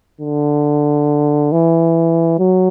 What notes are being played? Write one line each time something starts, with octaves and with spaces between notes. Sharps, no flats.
D3
E3
F#3